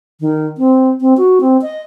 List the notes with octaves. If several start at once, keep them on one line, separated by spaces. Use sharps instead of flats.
D#3
C4
C4
F#4
C4
D#5